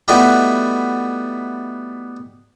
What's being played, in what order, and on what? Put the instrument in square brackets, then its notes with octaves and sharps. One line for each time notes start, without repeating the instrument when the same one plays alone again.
[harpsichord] G3 A3 B3 D#4 E4 F#4